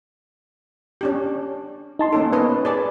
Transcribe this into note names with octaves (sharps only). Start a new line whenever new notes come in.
C#4 D4 G4
D#4 A5 C6
A#3 C#4 A4
B3 C#4 B4 D#5
G#4 D5 A5